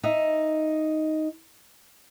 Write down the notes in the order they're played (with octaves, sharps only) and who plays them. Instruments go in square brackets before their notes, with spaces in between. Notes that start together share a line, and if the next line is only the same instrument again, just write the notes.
[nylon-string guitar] D#4 D#5 E5